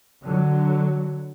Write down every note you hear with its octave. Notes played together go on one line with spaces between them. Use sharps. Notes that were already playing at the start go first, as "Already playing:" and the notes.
D3 F#3